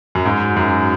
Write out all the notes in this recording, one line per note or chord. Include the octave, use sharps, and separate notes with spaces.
F#2
G#2
F#2